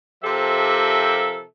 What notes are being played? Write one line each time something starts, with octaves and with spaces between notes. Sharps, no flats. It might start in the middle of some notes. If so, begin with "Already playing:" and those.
C3 F3 G4 A4 A#4 E5